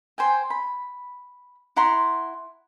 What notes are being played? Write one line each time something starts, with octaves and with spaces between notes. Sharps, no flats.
C5 G5 G#5
B5
E4 F#5 A#5 C6